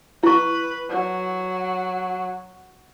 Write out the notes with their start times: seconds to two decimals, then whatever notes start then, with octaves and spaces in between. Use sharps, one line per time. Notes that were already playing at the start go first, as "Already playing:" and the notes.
0.23 E4 B4 C#6
0.90 F#3